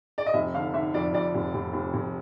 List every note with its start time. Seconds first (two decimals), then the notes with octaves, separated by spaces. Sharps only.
0.18 D5
0.26 D#5
0.34 F1 E5
0.54 D3 F5
0.73 D3 E5
0.94 F2 D5
1.13 F2 D5
1.35 F1
1.54 F1
1.74 F1
1.94 F1